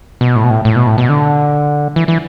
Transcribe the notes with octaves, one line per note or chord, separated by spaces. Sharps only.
B2
A2
B2
A2
A2
B2
A2
B2
D3
E3
E3